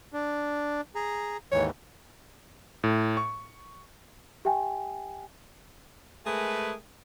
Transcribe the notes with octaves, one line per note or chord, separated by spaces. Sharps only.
D4
G#4 A#5
D#2 G#2 E3 C#5
A2
C#6
G4 E5 G5 G#5
G#3 A3 G#4 A#4 B4